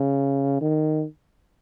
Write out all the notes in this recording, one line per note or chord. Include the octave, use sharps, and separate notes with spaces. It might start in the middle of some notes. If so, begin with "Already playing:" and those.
Already playing: C#3
D#3